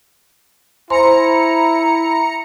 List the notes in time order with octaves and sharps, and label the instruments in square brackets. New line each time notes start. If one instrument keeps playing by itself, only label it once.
[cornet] E4 [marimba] C5 G#5 C6 [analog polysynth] A#5 C#7